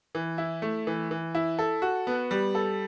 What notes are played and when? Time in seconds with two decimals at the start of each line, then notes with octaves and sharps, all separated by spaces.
0.15 E3
0.38 E4
0.62 A3
0.87 E3
1.11 E3
1.35 E4
1.59 A4
1.82 F#4
2.07 B3
2.31 G3
2.55 A4